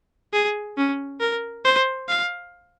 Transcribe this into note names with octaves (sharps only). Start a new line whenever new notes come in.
G#4
C#4
A#4
C5
F5